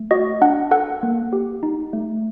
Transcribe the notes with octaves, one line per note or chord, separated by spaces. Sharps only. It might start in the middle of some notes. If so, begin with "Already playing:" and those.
Already playing: A3
F#4 D#5
D4 F#5
A4 F#5
A#3
G4
D#4
A3